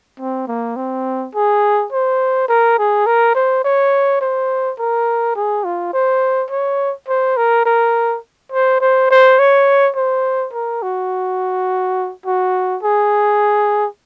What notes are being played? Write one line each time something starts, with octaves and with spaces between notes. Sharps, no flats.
C4
A#3
C4
G#4
C5
A#4
G#4
A#4
C5
C#5
C5
A#4
G#4
F4
C5
C#5
C5
A#4
A#4
C5
C5
C5
C#5
C5
A#4
F#4
F#4
G#4